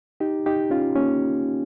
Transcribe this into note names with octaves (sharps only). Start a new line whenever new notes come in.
D#4 G4
D#4 G4
C#4 F4
A#3 C#4